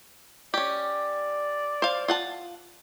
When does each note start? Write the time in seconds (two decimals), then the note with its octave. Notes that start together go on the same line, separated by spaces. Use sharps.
0.54 C#4 G4 D5
1.82 C5 F5
2.08 F4 F#5 A5